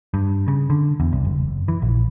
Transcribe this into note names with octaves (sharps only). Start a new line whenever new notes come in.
G2
C#3
D3
E2
C2
F#1
E3
A#1